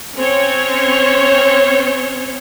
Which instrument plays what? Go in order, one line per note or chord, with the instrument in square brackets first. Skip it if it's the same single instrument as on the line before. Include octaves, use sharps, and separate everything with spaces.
[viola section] C4 C#4 C5 C#5